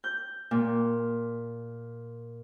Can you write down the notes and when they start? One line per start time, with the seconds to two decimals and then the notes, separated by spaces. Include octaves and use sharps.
0.04 G6
0.51 A#2